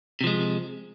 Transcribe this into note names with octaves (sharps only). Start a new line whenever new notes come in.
C3 F3 G#3